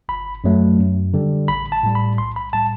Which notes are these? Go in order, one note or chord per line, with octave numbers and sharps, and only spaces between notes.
G1 B5
F#2 F#3 A3
F#2
D3 G3
A1 B5
A5
A2 G3
B5
B1 C6
B5
A2 G3 A5